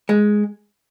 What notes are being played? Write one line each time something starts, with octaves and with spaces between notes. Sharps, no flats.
G#3